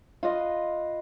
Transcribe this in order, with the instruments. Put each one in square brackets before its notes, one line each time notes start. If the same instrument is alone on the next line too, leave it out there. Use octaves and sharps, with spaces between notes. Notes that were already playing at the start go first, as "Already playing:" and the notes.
[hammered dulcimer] F4 B4 D#5